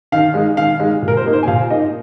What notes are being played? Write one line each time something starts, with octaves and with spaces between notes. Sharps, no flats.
D#3 F5
G#3 D#4
D#3 F5
G#3 D#4
A#2
A#4
C5
A#3 D#4
C5
G#5
A#2 F5
A#3 D#4 D#5